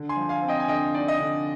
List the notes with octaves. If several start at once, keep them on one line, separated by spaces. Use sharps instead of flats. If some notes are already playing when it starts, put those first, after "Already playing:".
Already playing: D3
G#5 C6
F3
F5 G#5
C4
D#5 G5
G#5
D3 D#5 G5
D#4 D5
D#5
D3